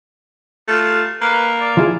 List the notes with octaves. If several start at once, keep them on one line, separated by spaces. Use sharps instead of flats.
A3 F4
A#3 B4
D5
F3 E4 G#4